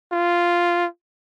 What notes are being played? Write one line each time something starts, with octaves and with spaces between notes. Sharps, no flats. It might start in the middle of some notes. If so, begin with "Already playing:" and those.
F4